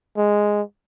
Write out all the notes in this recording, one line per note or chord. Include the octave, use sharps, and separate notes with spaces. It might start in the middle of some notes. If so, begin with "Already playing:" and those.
G#3